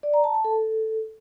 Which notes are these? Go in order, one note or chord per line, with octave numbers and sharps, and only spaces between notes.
D5
A#5
A5
A5
A4